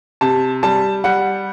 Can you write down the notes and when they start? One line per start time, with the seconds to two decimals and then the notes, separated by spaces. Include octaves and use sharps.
0.21 C3 A5
0.63 G3 A5
1.04 G3 F#5